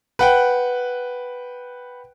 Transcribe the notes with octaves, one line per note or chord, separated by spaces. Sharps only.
B4 F#5 G5